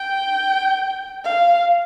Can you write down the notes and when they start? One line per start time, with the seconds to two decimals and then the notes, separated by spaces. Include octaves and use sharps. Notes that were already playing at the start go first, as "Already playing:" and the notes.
Already playing: G5
1.24 F5